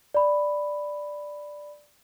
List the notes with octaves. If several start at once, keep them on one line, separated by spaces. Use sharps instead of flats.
D5 B5